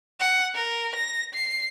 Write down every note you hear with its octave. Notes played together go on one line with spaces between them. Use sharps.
F#5
A#4
A#6
C7